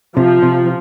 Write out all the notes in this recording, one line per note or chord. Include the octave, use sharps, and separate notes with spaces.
C3 F3
C3